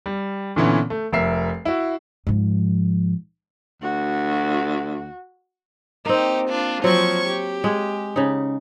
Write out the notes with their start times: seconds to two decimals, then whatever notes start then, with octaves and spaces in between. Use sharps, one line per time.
0.06 G3
0.56 A#2 D3 E3 B3 C#4
0.90 A3
1.13 F1 A#4 E5 C7
1.65 E4 F#4
2.27 G#2 F3
3.82 D2 F#4
6.05 A#3 C4 D#4 G4
6.48 D4 F4
6.84 F3 F#3 C4 C#6 G#6
7.28 G4
7.64 G#3 G#4
8.16 C#3 D#4